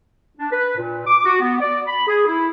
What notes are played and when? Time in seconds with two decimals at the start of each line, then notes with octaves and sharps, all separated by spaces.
0.37 D4
0.51 B4
0.77 A#2
1.07 D6
1.25 F#4
1.40 B3
1.60 D5
1.87 B5
2.07 G#4
2.26 E4